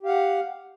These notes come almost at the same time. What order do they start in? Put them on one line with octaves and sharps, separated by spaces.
G4 F5 F#5